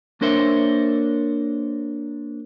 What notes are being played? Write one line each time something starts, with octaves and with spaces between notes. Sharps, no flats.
A#3 D4 A#4 C5 C#5 E5